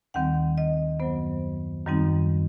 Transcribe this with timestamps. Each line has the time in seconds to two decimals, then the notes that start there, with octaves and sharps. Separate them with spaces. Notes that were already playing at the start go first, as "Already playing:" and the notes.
0.14 D#2 D#3 G3 C4 F#5
0.58 D#5
1.00 F#2 F#3 B3 C5
1.86 F#2 D#3 G3 C4 D#4